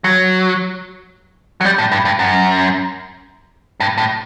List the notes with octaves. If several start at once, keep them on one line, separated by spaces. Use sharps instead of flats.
F#3
F#3
G3
A2
G2
G2
F#2
G2
A2